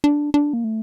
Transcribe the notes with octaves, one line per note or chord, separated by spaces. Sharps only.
D4
D4
A#3
A3